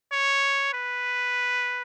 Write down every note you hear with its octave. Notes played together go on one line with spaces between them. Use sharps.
C#5
B4